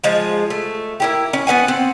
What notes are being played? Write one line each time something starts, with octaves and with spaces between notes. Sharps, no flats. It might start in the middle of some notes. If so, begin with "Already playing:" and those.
F3 G#3 F4
A3
A#3 E4 G4
C#4
B3 B4 F#5 G#5
C4